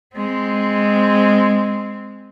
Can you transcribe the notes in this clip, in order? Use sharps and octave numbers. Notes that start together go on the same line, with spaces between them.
G#3 C4